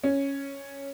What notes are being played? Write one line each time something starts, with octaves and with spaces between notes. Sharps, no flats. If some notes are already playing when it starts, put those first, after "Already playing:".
C#4